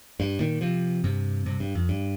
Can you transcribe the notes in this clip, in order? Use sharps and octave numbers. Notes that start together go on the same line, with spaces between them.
G2
A#2 D#3
C3 F3
G2 C3
G2 C3
G2
F2
G2